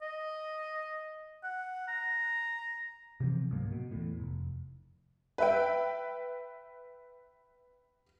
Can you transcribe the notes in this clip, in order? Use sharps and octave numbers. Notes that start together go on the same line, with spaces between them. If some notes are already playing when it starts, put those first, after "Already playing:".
D#5
F#5
A#5
C3 E3 F3 C4
C#2 G#2 F#3 A#3
B2
E2 A2
F1
B4 E5 G5